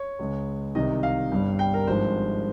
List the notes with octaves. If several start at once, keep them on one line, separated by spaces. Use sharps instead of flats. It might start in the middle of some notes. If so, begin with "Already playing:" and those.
Already playing: C#5
C#2 C#3 G#3
C2 C3 D#3 D#5
F5
G1 G2 G3
G5
A#4
G#1 G2 F3 G#3 C5